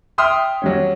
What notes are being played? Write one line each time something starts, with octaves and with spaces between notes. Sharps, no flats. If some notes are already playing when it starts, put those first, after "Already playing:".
E5 G5 C6 D#6 F6
F#3 G3 C#4